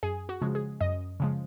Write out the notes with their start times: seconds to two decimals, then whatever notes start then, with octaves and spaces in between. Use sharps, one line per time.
0.03 F#2 G#4
0.29 F#4
0.42 C#3 F3 G#3
0.55 G#4
0.81 F#2 D#5
1.20 C#3 F3 G#3